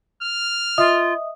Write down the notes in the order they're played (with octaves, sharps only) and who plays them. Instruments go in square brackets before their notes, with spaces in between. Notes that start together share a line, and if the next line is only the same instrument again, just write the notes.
[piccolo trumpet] F6
[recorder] F4 [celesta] D#5 E5 D#6